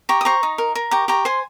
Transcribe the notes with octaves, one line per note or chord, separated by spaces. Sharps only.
G4 A#5 C#6
D#6
C5 A#5 C#6
D#4
A#4
A#4
G4 A#5 C#6
G4 A#5 C#6
C5 G#5 C6